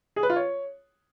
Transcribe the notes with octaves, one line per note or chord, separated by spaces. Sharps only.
G#4
B4
F4
C#5